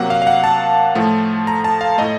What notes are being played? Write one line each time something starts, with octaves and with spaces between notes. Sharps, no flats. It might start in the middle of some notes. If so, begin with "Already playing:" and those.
Already playing: C3 F#3 A#3 F#5
F5
F5
F#5
A5
A2 F3 A3
A#5
A5
F5
A2 A3 D#5